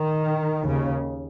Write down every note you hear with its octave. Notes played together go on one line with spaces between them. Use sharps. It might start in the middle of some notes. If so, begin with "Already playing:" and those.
Already playing: D#3
D#2 C#3